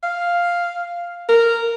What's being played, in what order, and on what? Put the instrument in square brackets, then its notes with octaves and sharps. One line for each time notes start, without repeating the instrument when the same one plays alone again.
[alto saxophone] F5
A#4